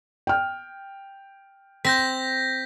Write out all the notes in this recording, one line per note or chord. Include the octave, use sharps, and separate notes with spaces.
G5 F6
C4 G6 A#6 B6